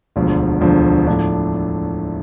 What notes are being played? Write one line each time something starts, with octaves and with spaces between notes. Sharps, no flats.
E1 D2 D3 F3
E1 D2 D3 F3
A2 F3 A3 D4